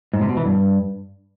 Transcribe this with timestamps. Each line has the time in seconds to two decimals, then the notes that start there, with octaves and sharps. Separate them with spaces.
0.13 G#2
0.21 C3
0.29 B2
0.37 E3
0.45 G2